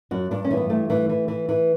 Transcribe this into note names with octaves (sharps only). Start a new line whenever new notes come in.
F#2 F#4
G2 D4
C#4
E3
B3
G2 A3
E3
E3
E3
E3